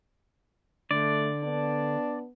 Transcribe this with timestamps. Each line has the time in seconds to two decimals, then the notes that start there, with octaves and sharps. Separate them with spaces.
0.91 D3 A3 D5
1.44 B3 D4